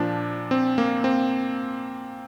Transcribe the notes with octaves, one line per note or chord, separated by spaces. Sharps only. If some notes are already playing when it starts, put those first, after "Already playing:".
Already playing: A#2 F3 D4
C4
A#3
C4